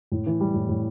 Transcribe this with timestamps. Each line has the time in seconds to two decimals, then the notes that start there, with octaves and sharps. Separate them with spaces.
0.12 A2
0.26 E3
0.40 G3
0.54 A2
0.69 A2